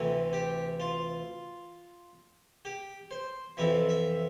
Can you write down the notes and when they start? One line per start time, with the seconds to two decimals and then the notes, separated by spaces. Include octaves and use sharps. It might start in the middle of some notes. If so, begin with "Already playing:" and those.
Already playing: D2 C3 E3
0.33 G4
0.80 F4
2.65 G4
3.11 C5
3.57 F2 C3 E3 E5
3.89 E5